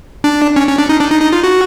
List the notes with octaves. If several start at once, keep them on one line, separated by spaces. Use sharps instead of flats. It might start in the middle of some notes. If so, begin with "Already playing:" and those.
D4
C#4
C#4
D4
D#4
D4
D#4
D#4
F4
F#4